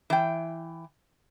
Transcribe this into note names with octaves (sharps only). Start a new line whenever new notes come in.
E3 G5